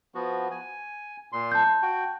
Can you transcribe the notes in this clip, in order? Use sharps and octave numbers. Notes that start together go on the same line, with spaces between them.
F3 B3 F#4
G#5
A#2 C6
A5 G6
F#4 G5